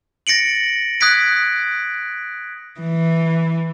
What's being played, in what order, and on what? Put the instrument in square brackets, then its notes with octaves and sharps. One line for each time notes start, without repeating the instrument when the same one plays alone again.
[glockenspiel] A6 A#6 C#7 D7 F#7
D#6 F#6 G#6 B6 D7
[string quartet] E3